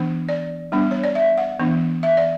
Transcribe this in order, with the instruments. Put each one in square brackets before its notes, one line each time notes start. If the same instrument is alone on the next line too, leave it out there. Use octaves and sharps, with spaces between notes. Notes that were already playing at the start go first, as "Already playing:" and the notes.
Already playing: [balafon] E3 B3 D4
D5
G3 B3 D4
C#5
D5
E5
F#5
E3 B3 D4
E5
D5